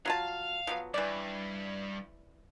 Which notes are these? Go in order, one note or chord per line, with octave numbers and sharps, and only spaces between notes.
F#3 F4 F5 A5
F3 F#3 B3
G2 E3 D5